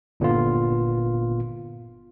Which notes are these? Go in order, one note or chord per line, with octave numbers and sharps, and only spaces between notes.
G1 A#2 D3 B3 F4